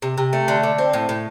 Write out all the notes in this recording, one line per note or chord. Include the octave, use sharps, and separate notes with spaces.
C3
C3
A3
D3
D3
C4
A2
A2